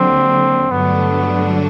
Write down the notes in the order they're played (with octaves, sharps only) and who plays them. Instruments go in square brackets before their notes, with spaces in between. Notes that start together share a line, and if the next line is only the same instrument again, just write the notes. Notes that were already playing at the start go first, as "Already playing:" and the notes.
Already playing: [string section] D#2 D3 F#3 [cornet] C4
[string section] G2 D3 F#3 A3 D4 [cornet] B3